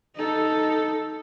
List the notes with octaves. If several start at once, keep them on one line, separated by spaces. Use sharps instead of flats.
D#4 A4